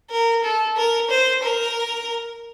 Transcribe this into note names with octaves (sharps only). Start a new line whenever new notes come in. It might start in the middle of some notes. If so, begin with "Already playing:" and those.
A#4
A4
A#4
C5
A#4